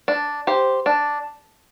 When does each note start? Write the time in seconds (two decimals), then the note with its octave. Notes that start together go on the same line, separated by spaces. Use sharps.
0.08 D4
0.47 G4 C5
0.86 D4